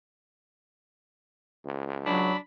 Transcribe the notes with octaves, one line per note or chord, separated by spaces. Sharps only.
C#2
F#3 D4 B5